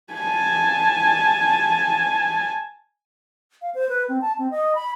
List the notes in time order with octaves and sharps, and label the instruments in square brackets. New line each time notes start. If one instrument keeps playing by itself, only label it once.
[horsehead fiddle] G#5 A5
[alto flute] F5
C5
B4
C4
A5
C4
D#5
B5